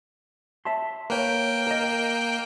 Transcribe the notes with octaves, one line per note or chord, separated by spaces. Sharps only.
E5 A5 C6
A#3 B4 C#5 G5
A#4 D#5